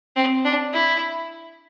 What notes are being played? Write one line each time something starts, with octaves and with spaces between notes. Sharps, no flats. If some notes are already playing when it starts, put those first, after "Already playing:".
C4
D4
E4